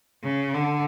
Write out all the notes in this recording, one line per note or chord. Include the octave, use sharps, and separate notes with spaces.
C#3
D3